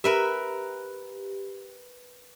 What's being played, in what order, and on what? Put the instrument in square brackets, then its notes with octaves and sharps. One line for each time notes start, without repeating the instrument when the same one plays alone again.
[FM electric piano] G4 [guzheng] A#4 B4 E5